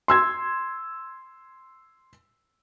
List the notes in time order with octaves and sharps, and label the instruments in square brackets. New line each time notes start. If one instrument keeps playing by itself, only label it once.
[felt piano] C6 E6 G#6